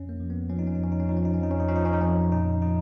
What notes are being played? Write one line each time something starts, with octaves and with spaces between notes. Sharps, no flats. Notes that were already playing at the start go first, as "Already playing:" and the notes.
Already playing: F2 C#4
A#3
F3
B3
F3 C#4
D#4
C#4
D#4
F2 C#4
D#4
C#4
F3 D#4
C#4
D#4
C#4
F2 D#4
C#4
D#4
F3 C#4
D#4
C#4
D#4
F2 C#4
A#2 D#4
F3 D#4